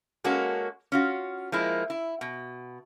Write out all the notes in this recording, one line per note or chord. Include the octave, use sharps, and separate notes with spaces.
G#3 A#3 C#4 F#4 A4
C#4 F4 F#4
F3 G#3 A#3 E4
E4
B2